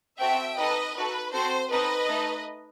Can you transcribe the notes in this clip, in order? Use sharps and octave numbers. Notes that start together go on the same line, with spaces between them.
C4 F#4 A4 E5 G5
D#4 A4 B4 D#5
D#4 F#4 A4 B4
C4 F#4 A4 C5
C4 D#4 A4 B4 D#5
A3 D#4 A4